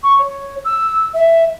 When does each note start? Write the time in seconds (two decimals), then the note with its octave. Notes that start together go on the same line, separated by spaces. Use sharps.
0.03 C#6
0.18 C#5
0.64 E6
1.13 E5